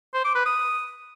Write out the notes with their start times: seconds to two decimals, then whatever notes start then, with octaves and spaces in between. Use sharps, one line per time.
0.14 C5
0.25 D6
0.35 B4
0.46 D#6